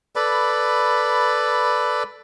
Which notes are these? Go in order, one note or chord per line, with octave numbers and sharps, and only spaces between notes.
A4 B4 D5 B5